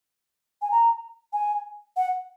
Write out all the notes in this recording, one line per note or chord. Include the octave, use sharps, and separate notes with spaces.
G#5
A#5
G#5
F#5